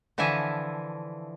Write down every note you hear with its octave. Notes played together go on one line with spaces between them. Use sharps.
D3 E3 F3 E5 G#5 A5